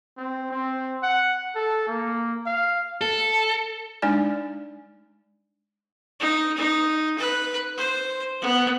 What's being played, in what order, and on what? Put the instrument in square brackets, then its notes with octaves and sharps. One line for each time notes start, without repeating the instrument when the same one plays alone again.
[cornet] C4
C4
F#5
A4
A#3
F5
[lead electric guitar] A4
[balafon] G#3 D4 D#4 D5 G#5
[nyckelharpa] D#4
D#4
B4
C5
B3